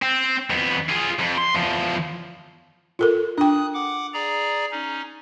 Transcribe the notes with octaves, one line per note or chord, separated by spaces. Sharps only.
C4
F2 B3
F4 G#4
F2
C6
E2 F3
F4 A4 A#4
D4 G5 D#6 F#6
F#5 D6
G#4 D5 A#5
C#4 D#4